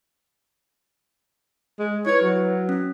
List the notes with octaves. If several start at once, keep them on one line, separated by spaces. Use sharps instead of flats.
G#3
E4 B4 C#5
F#3
C#4